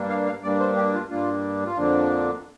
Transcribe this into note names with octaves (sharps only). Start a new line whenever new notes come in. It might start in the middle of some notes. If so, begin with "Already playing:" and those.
Already playing: G2 G3 A#3 D4
F5
F5
G2 G3 A#3 D4 D5
C5
G4
F4
G2 G3 A#3 D4 F4
F4
F2 D3 F3 A#3 D4